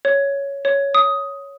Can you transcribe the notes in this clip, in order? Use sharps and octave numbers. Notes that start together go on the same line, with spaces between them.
C#5
C#5
D#6